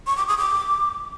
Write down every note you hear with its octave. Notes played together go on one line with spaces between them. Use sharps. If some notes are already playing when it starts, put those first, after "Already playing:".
C#6
D6
D#6
D6